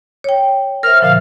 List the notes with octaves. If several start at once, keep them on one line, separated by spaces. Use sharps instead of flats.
C#5 G5
A#4 C5 E5 F6
A#2 D3 F3 F5